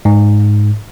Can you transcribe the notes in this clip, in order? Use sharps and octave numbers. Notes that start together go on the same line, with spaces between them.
G#2